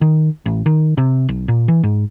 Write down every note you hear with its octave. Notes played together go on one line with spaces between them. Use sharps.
D#3
A1
D#3
C3
B1
A#2
E3
G#2